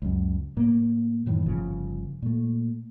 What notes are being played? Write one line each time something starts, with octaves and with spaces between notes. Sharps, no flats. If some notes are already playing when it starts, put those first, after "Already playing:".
C#2 F#2
A2 A#3
F#2 A2 D#3 E3
G1 C#3 F3
A#2 A3